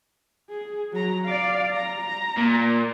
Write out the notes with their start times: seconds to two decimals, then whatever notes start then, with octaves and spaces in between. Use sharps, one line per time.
0.50 G#4
0.92 F#3 A#5
1.26 D5 F5
1.73 A#5
2.37 A#2